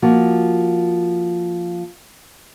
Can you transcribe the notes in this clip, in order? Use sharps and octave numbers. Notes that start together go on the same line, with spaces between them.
F3 A#3 F#4